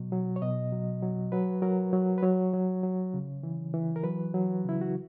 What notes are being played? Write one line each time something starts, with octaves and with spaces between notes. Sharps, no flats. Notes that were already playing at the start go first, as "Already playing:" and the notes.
Already playing: B2 F#3
F#3
C#5
B2 D#5
F#3
F#3
F#3 B4
F#3 A#4
F#3
B4
F#3 C#5
F#3
F#3
C#3
E3
E3
A#4
F#3 B4
F#3
C#3 E4
F#4